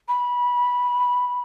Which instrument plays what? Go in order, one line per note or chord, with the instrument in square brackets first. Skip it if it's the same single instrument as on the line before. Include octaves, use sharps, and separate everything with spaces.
[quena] B5